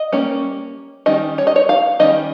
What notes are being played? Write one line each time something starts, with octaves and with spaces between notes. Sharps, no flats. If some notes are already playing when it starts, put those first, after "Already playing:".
Already playing: D#5
G3 A#3 C#4
D#3 G3 C#4 D#5
C#5
D#5
C#5
F5
D#3 G3 C#4 D#5